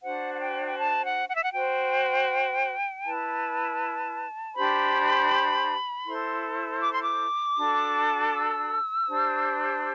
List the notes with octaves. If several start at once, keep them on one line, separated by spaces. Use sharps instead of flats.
D4 F#4 C5 F#5
F#5
G5
G5
A5
F#5
F#5
E5
F#5
F#4 C5 G5
E4 B4 A5
D4 G4 C5 B5
E4 A4 C5 C6
D6
C6
D6
D4 F#4 A4
E6
D4 G4 C5